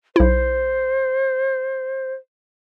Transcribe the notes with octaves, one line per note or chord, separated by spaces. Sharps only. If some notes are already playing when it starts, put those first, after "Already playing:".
B1 E4 C5